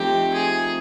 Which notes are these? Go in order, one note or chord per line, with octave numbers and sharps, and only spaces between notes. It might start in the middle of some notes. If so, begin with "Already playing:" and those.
Already playing: F3 A3 C4 D#4 G4
G#4